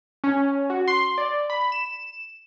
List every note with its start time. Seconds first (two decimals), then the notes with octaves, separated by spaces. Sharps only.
0.24 C#4
0.70 F#4
0.88 C6
1.18 D5
1.50 B5
1.72 E7